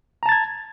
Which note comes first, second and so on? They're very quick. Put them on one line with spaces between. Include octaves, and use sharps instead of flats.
A#5 A5 A6 G#6